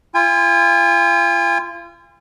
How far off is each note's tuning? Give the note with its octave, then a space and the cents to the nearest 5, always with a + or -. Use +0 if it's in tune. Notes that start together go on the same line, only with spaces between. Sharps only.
F4 -35 G#5 -40